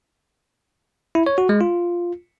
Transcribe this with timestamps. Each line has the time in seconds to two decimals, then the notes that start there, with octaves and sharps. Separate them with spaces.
1.15 E4
1.26 C#5
1.38 F#4
1.49 G#3
1.61 F4